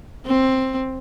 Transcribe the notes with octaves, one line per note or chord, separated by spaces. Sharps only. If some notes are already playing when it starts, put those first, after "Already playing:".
C4